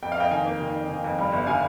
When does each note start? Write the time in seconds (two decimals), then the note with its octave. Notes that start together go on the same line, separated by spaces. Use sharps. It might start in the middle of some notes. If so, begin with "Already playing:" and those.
0.03 F2 G5
0.12 F5
0.17 F2 D#5 G5
0.31 D#3 F5 G#5
0.46 A#3
0.60 D#3
0.75 F2
0.89 D#3
1.04 F2
1.18 G2
1.32 G1
1.47 D3 F5 G#5